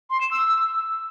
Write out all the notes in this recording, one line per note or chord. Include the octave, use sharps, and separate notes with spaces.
C6
E7
E6